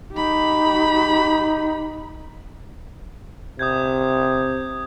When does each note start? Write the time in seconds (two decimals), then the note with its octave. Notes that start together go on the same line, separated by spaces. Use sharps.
0.13 D#4 G4 B5
3.59 C3 D#6 G6 G#6